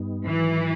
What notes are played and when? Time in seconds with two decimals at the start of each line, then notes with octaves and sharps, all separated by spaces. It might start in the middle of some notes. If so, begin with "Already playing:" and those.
Already playing: G2 G3 B3 D#4
0.27 G#2 D#3 E3 F#3